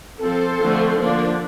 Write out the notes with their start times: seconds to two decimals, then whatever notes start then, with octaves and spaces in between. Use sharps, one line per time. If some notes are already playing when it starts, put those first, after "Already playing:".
0.22 F3 C4 A4 C5
0.60 D3 F3 A3 C4
0.99 D3 F3 A#3 D4